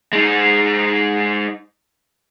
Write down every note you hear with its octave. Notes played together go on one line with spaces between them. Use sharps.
G#3 D#4